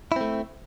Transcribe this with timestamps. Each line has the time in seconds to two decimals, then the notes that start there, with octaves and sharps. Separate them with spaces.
0.12 E4
0.16 C4
0.21 A3